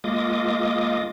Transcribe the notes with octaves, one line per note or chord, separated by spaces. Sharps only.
G#3 A#3 F4 D#5 D6 D#6